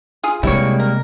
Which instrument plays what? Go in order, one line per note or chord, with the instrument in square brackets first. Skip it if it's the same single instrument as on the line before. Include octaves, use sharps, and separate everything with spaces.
[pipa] F4 G#4
[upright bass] C3 [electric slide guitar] G3 G#3 A#3 [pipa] E4 C#5
[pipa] A#4